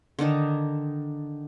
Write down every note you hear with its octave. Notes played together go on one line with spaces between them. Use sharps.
D3 D#3 D4 D#4